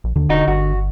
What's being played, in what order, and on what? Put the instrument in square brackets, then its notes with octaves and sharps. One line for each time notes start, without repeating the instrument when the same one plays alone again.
[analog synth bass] A#1
[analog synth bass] D#2 [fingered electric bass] D3
[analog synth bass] E1 [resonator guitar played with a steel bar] D#4 F#4
[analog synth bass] G1 [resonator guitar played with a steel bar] F#4